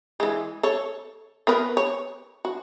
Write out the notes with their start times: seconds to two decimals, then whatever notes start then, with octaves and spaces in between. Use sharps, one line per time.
0.20 E3 G#3
0.63 A4 C#5
1.47 B3 A#4 B4
1.77 C#5
2.45 F#4